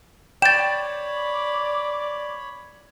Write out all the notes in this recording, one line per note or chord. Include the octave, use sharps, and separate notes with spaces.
C#5 D5 G5 B5 A6 E7